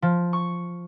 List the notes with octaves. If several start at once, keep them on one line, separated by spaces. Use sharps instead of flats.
F3
C#6